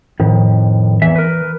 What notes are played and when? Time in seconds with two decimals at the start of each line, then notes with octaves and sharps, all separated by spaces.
0.20 F2 A2 D#3
1.02 E2 E3 E5
1.16 A#4 B4